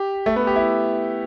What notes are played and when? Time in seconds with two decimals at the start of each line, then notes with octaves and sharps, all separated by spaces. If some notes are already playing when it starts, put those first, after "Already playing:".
Already playing: G4
0.26 A3
0.36 B3
0.47 G4
0.56 E4